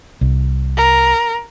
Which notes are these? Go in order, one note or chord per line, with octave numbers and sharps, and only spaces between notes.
C2
A#4